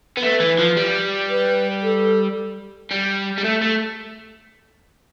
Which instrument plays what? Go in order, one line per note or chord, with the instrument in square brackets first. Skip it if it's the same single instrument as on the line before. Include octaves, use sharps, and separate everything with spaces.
[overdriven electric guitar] B3
[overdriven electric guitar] A3 [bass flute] B4
[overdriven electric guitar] E3
F3
G3
[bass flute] B4
A4
[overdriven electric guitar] G3
G3
A3
A3